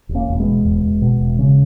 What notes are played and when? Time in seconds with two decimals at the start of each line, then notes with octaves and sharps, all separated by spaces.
0.09 E1
0.15 A#3 C#4
0.28 E1
0.40 G#3 B3
0.47 B2
0.64 E1
0.83 E1
1.02 B2
1.21 E1
1.39 C#3